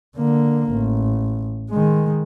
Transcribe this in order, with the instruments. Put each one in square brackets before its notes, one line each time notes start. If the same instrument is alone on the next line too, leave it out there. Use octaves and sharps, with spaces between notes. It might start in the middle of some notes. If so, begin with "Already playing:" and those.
[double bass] D3 A#3
A1
D#3 G#3